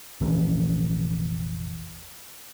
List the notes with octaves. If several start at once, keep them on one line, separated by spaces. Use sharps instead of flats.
F1 A#1 F2 E3